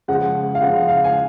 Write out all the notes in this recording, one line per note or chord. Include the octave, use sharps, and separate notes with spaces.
C#3 F3 G#3 F#5
F5
C#3 F3 G#3 F#5
F5
G#5